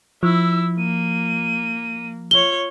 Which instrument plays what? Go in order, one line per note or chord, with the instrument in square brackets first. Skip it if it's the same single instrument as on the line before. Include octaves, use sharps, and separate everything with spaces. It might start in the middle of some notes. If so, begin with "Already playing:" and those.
[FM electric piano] F3 [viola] E4 [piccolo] E6
[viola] A#3 [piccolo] D#7
[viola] F4 C#5 [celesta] G7